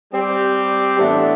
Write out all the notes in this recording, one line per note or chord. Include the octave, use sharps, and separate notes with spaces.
G3 C4 G4
A2 E3 B3 D4